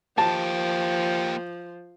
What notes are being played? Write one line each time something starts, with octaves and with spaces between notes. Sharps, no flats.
F3 A#3 G4 A5